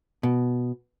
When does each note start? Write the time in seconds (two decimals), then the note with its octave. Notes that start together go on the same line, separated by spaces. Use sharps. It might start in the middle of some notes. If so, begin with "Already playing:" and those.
0.23 B2